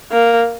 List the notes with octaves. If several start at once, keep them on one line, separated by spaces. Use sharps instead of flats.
A#3